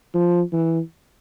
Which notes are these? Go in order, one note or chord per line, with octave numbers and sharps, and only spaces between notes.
F3
E3